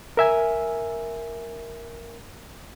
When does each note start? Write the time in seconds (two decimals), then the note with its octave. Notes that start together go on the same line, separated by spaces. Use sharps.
0.17 A#4 E5 G#5